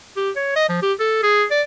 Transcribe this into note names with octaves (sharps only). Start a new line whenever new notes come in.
G4
C#5
D#5
F3
G4
A4
G#4
D5